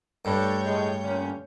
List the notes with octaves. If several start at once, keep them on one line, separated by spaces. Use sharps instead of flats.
G2 A3 D4 A4 C#5 G6
A2 G#3
A#2 D3 C#4